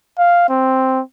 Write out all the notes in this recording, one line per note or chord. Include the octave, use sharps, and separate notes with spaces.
F5
C4